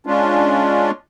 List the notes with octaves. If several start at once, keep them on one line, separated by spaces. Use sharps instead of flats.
G#3 C#4 D4 F4